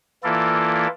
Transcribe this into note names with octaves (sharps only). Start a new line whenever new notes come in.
E3 A#3 E4 F4 A4 D5